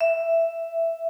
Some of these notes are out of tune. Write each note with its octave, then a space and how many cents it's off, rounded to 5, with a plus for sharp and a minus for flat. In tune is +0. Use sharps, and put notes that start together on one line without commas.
E5 +5